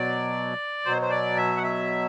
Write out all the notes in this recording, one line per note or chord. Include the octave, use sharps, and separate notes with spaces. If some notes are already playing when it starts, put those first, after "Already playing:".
Already playing: B2 F#3 D5
B2 F#3 C5
C5
D5
E5
F#5
E5